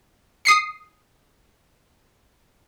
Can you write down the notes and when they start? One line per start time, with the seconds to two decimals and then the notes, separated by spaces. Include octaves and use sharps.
0.45 D#6 C7 C#7